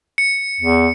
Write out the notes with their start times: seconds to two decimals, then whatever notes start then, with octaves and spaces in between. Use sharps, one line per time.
0.18 C#7
0.61 E2